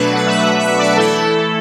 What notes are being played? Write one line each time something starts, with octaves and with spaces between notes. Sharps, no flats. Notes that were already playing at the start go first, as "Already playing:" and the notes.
Already playing: B2 F#3 A3 D4 B4
F#5
E5
E5
D5
E3 A3 E4 A4